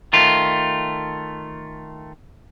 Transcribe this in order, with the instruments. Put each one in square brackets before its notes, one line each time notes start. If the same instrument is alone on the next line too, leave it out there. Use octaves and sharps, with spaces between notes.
[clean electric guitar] D#3 A3 F4